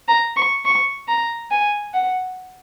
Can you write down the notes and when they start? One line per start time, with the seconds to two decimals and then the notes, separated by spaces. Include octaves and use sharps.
0.08 A#5
0.37 C#6
0.65 C#6
1.08 A#5
1.51 G#5
1.94 F#5